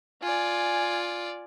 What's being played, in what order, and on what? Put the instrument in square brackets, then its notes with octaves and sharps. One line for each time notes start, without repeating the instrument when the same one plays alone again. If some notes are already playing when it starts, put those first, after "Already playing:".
[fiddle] F4 D5 [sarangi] G#5